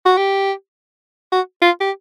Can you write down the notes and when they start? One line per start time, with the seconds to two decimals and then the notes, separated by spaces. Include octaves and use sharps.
0.06 F#4
0.17 G4
1.32 F#4
1.62 F4
1.81 G4